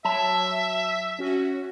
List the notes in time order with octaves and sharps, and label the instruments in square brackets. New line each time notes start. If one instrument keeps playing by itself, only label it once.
[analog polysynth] F#3 [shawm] E5 [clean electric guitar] A5
[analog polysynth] C#4 F#4